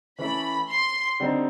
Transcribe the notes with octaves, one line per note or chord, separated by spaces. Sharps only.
E3 A3 C#4 E4 A4 B5
C6
D3 G3 C4 D#4